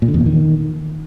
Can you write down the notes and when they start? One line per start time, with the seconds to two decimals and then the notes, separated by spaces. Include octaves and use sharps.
0.02 A#2
0.08 D3
0.14 E2
0.20 A#2
0.26 D#3